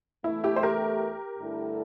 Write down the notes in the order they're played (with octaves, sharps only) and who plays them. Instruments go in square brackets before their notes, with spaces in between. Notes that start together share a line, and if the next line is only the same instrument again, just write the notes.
[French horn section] E2 E3 A3 [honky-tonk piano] E4
[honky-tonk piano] E4 G4
C5
G4 A#4
[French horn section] G2 D3 A3 E4 A4